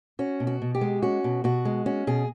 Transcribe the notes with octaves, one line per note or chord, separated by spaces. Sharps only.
C#4 F#4
B2
F#4
B2
G4
G#3
C#4 F#4
B2
B2 F#4
G#3
C#4 F#4
B2 G#4